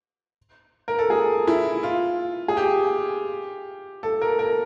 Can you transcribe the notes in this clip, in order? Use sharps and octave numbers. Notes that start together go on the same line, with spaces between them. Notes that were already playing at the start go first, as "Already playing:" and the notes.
A#4
A4
G#4
E4
F4
G#4
G4
A4
A#4
A#4